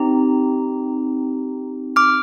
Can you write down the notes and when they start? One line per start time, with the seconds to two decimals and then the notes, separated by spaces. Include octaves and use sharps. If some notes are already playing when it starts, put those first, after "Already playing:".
Already playing: C4 D#4 G4 A#5
1.96 D6 F6